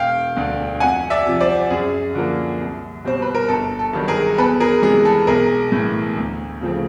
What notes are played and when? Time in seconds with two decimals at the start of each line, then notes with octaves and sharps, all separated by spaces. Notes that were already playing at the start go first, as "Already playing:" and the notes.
Already playing: E1 F5 G5
0.37 D2 D3
0.80 F2 F#5 G#5
1.10 D5 E5
1.26 C3 F3
1.40 C5 D5
1.70 F#2 G#4
2.15 D3 F3 A#3
2.60 C2
3.04 B2 G3 C4 C5
3.22 B4
3.35 A#4
3.48 G1 A4
3.79 A4
3.93 G2 D#3 F#3
4.08 G#4 A#4
4.38 E2 A4 B4
4.60 G#4 A#4
4.82 C3 E3 G#3 G#4
5.05 A4
5.27 B1 G#4 A#4
5.72 A2 E3
6.17 D2
6.61 C#3 F3 A3 C4